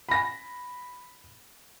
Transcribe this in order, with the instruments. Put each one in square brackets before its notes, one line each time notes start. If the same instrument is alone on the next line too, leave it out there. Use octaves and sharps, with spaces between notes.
[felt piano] B5 A#6